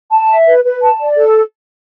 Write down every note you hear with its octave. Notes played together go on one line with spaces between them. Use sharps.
A5
E5
B4
B4
A5
D5
A4